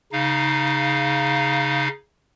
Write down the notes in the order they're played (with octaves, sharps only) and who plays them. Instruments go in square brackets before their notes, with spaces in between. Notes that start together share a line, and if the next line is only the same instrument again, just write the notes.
[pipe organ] C#3 D#4 F5